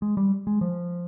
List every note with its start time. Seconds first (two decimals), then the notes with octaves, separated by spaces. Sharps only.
0.02 G#3
0.17 G3
0.47 G#3
0.61 F3